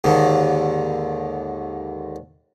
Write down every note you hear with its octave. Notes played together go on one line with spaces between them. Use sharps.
D#2 G#2 D3